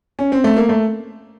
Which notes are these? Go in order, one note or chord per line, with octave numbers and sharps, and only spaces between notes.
C#4
C4
A3
A#3
A3